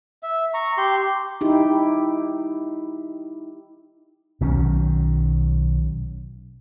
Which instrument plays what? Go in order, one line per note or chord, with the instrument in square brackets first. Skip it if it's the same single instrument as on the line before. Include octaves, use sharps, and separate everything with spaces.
[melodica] E5
A#5 C#6
G4 C6
[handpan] D#4 E4 G4
[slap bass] B1 D#3 F#3 C#4